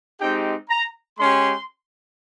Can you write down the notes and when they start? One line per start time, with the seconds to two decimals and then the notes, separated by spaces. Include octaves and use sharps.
0.20 G#3 C4 D#4 G4 G5
0.70 A#5
1.19 G#3 C#4 G4 C6